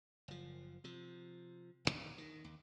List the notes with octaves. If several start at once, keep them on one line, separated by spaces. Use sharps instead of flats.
F#1 F3
C3 F3
D#1 A1 D#2
D#3
D#2